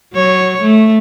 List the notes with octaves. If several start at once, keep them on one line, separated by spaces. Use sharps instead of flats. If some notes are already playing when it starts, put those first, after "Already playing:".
F#3 C#5
A3